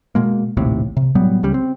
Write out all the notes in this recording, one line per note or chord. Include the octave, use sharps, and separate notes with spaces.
B2 G#3 A#3
A#1 D#2 A2 C3
C3
A2 F#3 G3 B3
C#2 C#3 G3
C4